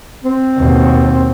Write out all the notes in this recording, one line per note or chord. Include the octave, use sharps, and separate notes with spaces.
C4
D#2 B2